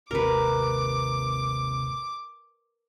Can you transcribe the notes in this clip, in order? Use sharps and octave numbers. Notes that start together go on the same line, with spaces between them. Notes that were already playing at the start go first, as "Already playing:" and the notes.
G#1 D#2 C3 A#4 B4 D6